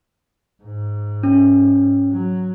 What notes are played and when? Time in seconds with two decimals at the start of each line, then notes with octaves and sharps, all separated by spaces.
0.64 G#2
1.23 C#4
2.11 F#3